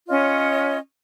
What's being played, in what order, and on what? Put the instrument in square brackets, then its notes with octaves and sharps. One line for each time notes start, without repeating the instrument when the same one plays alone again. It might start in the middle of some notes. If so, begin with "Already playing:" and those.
[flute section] C#4 F4 C#5 D#5